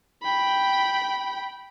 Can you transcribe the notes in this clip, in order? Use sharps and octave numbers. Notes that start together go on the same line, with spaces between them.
G5 B5